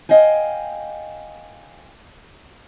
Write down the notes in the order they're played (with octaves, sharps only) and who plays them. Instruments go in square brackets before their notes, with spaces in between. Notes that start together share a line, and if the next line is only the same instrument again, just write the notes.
[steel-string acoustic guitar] D#5 F5 G5 G#5